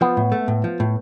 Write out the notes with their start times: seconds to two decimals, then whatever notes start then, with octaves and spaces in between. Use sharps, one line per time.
0.01 F3 B3
0.17 A2
0.32 A3
0.48 A2
0.64 F3
0.80 A2